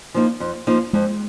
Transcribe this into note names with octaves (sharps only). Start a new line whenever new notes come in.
F3 A#3 D#4
F2
F3 A#3 D#4
F2 G#3